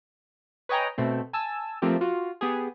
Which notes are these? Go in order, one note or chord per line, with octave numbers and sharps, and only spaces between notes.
B4 C#5 D#5 G5 G#5 A#5
B2 A3 C4
G#5 A5 E6
F3 A3 A#3 C4 F4 G4
F4 F#4
B3 G4 G#4